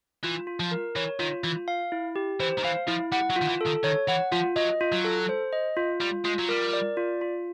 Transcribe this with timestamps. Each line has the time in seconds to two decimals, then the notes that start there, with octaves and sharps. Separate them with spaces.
0.24 E3 F4
0.47 F4
0.60 F3
0.71 A#4
0.96 E3 C#5
1.19 D#3 F4
1.44 E3 F4
1.68 F5
1.92 E4
2.16 G4
2.40 E3 C5
2.58 D#3
2.64 E3 F5
2.88 F3 E4
3.12 G3 F#5
3.30 F#3
3.36 F4
3.42 D#3
3.48 E3
3.61 A4
3.66 D#3
3.84 D#3 C#5
4.08 E3 F#5
4.32 F3 F4
4.56 F#3 D#5
4.81 F4
4.92 F#3
5.05 A4
5.29 C5
5.53 D#5
5.77 F4
6.00 G3 F4
6.25 G#3 F4
6.39 F#3
6.49 G3 A#4
6.73 D5
6.97 F4
7.21 F4